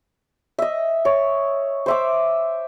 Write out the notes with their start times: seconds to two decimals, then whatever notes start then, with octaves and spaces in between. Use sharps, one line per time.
0.58 D#5 E5
1.05 C#5
1.86 C5 E5 D6